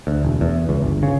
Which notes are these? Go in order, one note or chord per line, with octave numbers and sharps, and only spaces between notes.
D2
E1
E2
C#2
G1
C#3